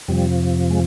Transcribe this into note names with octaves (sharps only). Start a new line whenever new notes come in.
F2 C3 F3 G3
G#3